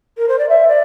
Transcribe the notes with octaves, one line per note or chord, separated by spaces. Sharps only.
A#4
C5
D5
E5
D5